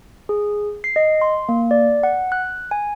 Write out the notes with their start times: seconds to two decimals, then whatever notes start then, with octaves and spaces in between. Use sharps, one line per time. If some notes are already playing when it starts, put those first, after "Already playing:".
0.29 G#4
0.84 C7
0.96 D#5
1.22 C6
1.49 A#3
1.71 D5
2.03 F#5
2.32 F#6
2.71 G#5